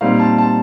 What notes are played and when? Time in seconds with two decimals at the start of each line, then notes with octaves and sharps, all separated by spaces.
0.01 A#2 G3 C4 D#4 F5
0.20 A5
0.38 A5